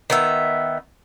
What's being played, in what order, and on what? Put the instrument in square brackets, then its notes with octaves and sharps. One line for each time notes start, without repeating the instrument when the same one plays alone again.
[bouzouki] D#3 B3 E5